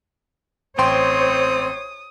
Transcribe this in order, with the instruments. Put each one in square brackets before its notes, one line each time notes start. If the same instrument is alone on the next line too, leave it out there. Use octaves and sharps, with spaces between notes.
[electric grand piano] A1 G5 C6 [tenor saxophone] C4 [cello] C5 C#5 [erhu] D#6